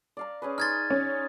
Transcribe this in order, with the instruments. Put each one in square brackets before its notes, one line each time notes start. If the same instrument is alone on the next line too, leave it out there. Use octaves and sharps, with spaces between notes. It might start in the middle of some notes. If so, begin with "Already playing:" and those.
[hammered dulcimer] D5 F5 A#5
C#4 G#4 B4
[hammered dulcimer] D#4 C6 [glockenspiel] F6 G#6 A6
[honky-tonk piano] C#4